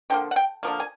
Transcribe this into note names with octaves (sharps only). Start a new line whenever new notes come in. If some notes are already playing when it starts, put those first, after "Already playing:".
D3 F3 A#3 G5
F#5
G5
D3 F3 A#3
G#5